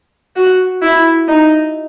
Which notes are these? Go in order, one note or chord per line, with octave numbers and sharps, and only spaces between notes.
F#4
E4
D#4